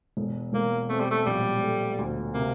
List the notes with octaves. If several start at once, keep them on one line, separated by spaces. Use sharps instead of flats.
E1
E1 A#3
A3 C4
G3
A3
A#1 G3
A3
D2
C3 A#3